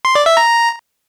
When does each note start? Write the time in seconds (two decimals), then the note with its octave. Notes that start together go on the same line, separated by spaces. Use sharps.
0.05 C6
0.15 D5
0.26 E5
0.37 A#5